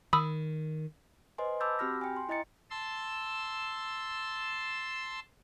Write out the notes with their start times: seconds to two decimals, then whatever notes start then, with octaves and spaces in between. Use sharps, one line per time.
0.13 D#3 B5 D#6 E6
1.38 B4 C5 D#5 G#5 C6
1.60 A5 B5 D6 E6 G6 A6
1.79 C4 F#4 G4 B5 F6 A#6
2.01 G5 G#5
2.16 C6
2.29 E4 D#5 A#5 A6 C#7
2.70 A5 C6 E6